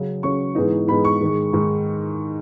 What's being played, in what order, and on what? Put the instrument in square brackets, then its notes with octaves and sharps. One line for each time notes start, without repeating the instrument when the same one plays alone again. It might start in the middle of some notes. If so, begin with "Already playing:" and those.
Already playing: [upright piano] C#3 F#3 C#4
C#3 F#3 C#4 C#6
G#2 E3 G#3 B3 D#4
G#2 E3 G#3 B3 D#4 B5
C#6
G#2 D#3 G#3
G#2 D#3 G#3